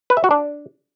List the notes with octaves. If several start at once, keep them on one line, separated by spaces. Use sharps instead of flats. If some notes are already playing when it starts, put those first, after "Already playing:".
B4
E5
F#4
D4